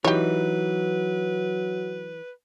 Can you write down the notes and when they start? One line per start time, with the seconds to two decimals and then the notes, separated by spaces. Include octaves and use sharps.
0.04 E3 F#3 D#4 G4 B4 C#5